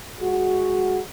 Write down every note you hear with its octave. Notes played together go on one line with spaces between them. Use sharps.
G#3 F#4 G#4